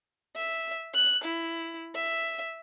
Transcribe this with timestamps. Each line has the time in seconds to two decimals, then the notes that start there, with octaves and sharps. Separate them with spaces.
0.36 E5
0.94 F#6
1.24 E4
1.95 E5